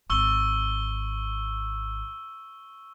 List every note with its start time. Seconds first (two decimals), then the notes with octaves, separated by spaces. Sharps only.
0.10 G#1 C#6 E6 G7